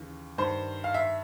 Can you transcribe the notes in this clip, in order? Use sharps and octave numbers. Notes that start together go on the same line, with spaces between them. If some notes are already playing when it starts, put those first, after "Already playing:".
Already playing: D#2 C#3 E3
G2 D#3 C5
F5
E5